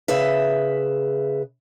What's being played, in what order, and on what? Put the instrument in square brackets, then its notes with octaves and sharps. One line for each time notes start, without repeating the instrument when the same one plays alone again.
[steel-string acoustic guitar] C#3 G#4 B4 E5